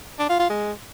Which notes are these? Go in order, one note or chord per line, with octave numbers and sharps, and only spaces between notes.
D4
F4
F4
G#3